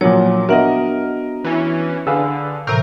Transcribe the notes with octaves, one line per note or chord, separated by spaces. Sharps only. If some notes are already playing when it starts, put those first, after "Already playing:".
A#2 F3 F#3 C#5 F#5
B3 D4 F#4 A#4 D#5 E5 F#5 A#5
E3 C#4
D3 G#4 B4 F5 E6
A2 C3 E3 A#4 G6